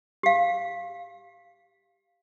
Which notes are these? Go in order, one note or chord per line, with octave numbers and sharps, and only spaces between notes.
G4 F5